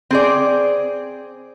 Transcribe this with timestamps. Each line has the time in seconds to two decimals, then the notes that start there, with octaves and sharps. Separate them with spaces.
0.11 C4 G#4 D5